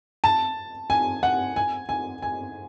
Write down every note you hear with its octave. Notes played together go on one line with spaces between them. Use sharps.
A5
G#5
F#5
G#5
G#5
G#5